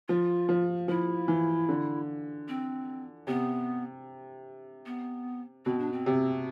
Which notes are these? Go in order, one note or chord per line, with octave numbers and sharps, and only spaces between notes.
F3 F4
F3
F3 E4
E3
D3
C4
C3 B3
B3
B2 C4
D4
C4
C3